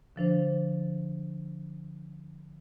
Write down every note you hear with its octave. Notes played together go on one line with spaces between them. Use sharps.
D3 F3 D4 C5